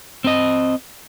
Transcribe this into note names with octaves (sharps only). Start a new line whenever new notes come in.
C4 D#5